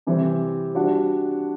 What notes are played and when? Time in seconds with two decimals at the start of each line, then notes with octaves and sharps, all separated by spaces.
0.07 C3 E3 G3 C4 G4
0.75 G3 D4 F#4